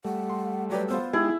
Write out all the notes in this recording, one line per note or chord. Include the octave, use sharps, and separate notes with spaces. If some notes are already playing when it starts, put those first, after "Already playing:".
G3 A3 F#5
C6
F#3 G4 B4 D5
B3 F4 C5 E6
G#3 D#4 E4 G4 G#4